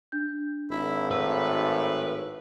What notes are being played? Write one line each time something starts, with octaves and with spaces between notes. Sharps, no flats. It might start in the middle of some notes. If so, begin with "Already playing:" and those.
D4 G6
G#1 E4
A2 B4 E6